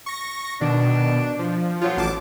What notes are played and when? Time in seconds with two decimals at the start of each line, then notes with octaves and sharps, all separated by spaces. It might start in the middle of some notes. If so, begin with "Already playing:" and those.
0.06 C#6 A#6
0.61 B2 D#3 D4
1.39 F3
1.82 A#2 F3 F#3 F4
1.97 A1 A5 D6